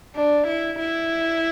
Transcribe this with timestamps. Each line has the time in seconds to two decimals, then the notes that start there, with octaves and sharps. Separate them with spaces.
0.16 D4
0.47 E4
0.79 E4